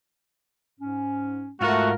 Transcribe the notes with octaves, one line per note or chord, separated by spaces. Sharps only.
G#2 C#4
G#2 A3 F4 F#4 A#4